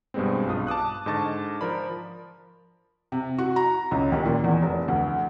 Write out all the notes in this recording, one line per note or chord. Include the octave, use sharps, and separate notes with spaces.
G2 B2 G3 G#3 B3 C4
B1 G2 F4 D#6
A5 D6 D#6 F#6
G#2 D3 D#5 A5 C#6 A6
F3 A#4 D5 B5
C3
F#4
A#5
C#2
D#2
A#2
E2
F1
D2